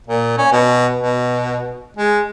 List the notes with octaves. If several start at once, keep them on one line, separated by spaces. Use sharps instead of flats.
A#2
C#4
B2
B2
G#3